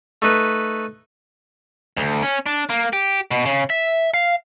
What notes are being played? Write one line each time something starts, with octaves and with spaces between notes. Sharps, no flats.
A3 D#4 B4
D2
C#4
D4
A#3
G4
B2
C#3
E5
F5